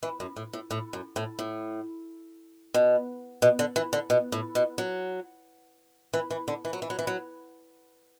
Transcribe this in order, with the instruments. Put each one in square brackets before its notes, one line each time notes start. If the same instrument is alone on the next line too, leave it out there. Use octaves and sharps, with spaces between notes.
[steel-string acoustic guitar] E3
F#2
A2
A2
A2
F#2
A2
A2
B2
B2
D3
E3
D3
B2
A2
B2
F#3
E3
E3
D3
E3
F#3
E3
F#3
E3
F#3